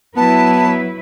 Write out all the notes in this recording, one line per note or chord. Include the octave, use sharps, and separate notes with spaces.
F#3 B3 E4 B4 A5